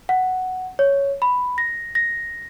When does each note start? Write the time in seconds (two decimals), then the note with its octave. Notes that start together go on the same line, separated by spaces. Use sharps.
0.09 F#5
0.79 C#5
1.22 B5
1.58 A#6
1.95 A#6